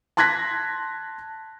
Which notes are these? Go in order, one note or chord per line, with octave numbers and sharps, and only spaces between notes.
A5 C6 F#6 G#6 A#6 B6